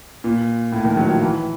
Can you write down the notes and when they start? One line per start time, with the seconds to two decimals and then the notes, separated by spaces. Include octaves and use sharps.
0.24 A#2
0.72 A2
0.85 D#3
0.97 F#3
1.09 F3
1.22 E3